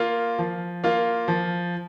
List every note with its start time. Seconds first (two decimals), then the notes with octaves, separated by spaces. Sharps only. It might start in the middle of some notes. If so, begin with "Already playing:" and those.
Already playing: A#3 F4
0.38 F3
0.84 A#3 F4
1.28 F3